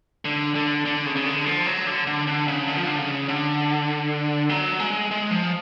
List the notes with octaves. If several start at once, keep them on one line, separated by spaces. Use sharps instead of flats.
D3
D3
D3
C#3
C#3
D3
F3
F#3
D3
D3
D3
C#3
D3
F3
D3
C#3
D3
F#3
G#3
G#3
F3